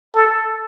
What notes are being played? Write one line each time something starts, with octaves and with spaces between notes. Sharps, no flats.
A4